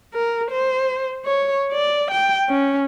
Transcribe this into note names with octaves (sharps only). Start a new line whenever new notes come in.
A#4
C5
C#5
D5
G5
C#4